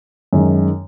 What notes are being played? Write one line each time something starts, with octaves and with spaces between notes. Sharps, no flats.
F#2 D#3 G#3 D#4